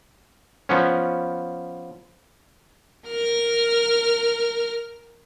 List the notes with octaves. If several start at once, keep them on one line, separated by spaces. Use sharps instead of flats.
F3 B3 C#4
A#4 F6